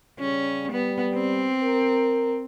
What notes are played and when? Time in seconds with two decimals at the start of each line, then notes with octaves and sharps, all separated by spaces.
0.20 C#3 G3 C#4
0.72 G3 B3
1.14 C4
1.62 A#4